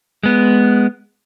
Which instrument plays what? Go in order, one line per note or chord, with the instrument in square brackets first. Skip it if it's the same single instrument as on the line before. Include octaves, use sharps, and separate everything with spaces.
[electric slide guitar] G#3 B3